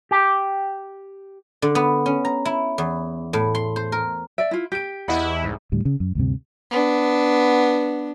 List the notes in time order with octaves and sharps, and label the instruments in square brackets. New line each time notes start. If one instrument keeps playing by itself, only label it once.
[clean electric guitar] G4
[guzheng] D3
B3
C#4
A#5
E4
E2
A2
C6
C5
A#4
[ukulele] D5 E5 [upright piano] D7
[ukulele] E4 F4
[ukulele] G4 [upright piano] G6 D7
[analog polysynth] E2 E4 [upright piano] D#5 F#5 B5
[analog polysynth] C2 G#2
[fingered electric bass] D2 A2 G3
C#3
F#2
D2 G2 C3
[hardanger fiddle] B3 D4